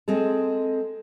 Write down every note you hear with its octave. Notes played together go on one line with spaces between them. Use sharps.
G#3 C4 G#4 A4